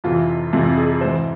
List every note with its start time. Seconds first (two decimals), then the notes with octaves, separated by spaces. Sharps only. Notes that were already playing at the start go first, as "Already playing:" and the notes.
0.04 F2 C3 E3 F4
0.53 F2 C3 E3 F4
0.77 G#4
1.01 G#2 E3 C5